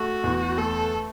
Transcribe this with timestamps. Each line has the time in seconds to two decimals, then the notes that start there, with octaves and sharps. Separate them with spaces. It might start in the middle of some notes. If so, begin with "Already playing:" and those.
Already playing: A3 F#4
0.24 E2
0.57 A3 A4